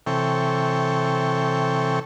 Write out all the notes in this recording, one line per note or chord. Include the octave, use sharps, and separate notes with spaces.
C3 E3 A4 C#5 G5